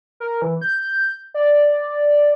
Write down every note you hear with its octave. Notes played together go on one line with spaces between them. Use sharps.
A#4
E3
G6
D5